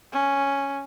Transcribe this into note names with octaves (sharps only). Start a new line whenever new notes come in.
C#4